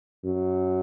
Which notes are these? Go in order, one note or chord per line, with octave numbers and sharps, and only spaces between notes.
F#2